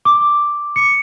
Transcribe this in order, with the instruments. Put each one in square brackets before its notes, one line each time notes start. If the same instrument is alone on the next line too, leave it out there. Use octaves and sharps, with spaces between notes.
[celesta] D6
C#7